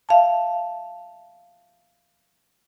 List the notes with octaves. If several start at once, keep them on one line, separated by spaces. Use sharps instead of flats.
E5 F5 A5